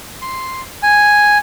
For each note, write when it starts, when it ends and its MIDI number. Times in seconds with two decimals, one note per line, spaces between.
0.22 0.61 84
0.83 1.38 80